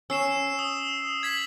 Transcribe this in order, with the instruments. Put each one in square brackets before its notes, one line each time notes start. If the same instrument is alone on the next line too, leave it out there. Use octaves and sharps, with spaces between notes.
[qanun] C#4 [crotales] E6 C7 E7
[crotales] D#6
G#6 B6 F#7